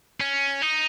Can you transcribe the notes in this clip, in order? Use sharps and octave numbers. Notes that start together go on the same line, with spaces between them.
C#4
D#4